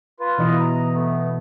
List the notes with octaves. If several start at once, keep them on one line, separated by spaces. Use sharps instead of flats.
F4 B4
B2 E3 D#5
A#5
A3 B3